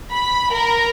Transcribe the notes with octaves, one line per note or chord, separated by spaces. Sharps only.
B5
A#4